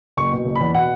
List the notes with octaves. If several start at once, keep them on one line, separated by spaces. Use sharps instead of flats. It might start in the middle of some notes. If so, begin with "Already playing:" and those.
F#1 C#6
B2
F#1
E2 B5
B2 F#5